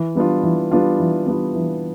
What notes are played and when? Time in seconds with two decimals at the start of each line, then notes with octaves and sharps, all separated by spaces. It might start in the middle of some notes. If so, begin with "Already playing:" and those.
Already playing: E3
0.15 G3 B3 D4 F4
0.43 E3
0.71 G3 B3 D4 F4
1.00 E3
1.26 G3 B3 D4 F4
1.55 E3